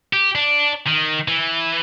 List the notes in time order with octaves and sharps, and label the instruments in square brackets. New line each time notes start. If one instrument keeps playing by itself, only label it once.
[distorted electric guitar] G4
D4
D#3
E3